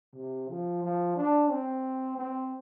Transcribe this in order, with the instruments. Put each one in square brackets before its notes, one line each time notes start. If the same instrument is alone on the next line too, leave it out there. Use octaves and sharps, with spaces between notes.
[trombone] C3
F3
F3
D4
C4
C4